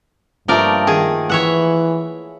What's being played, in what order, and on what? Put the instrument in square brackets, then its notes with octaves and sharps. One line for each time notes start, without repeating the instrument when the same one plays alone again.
[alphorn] G2 [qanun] F3 A3 A#3 [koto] D#4 A#4 D5
[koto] D#3 G#4
[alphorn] E3 [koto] C#5 E5 F#5